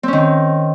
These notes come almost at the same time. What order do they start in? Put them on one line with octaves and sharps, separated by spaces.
C4 C#4 D#3